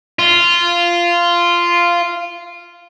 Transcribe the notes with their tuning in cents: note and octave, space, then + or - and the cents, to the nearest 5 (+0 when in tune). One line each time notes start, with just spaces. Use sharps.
F4 -10